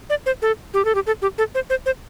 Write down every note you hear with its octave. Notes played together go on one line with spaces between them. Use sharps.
D5
C5
A4
G4
A4
G4
A4
G4
A4
C5
C5
C5